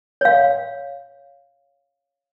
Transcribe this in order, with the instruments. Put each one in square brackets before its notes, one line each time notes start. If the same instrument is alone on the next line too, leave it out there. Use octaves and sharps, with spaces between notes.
[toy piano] C#5 F5